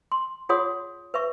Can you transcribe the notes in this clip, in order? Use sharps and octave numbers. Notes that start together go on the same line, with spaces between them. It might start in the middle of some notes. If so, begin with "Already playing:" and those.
C6
F4 G#4 C#5 F#5 C6 D#6
B4 E5 C#6